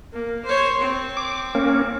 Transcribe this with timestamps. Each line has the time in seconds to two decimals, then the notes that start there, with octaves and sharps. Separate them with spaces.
0.13 A#3
0.45 C5 C#5
0.81 C4
1.17 D6
1.55 A#3 C#4